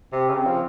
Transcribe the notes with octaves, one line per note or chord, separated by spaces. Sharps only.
C3 C4
C#3 C#4
C4
F3